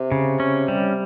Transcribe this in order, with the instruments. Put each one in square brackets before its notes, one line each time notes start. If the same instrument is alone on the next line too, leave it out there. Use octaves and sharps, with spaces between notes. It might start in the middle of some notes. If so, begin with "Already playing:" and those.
Already playing: [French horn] C3
[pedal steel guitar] C#3
C#4
G3